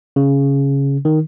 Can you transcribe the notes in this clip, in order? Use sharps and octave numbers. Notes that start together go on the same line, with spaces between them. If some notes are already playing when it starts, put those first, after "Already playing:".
C#3
D#3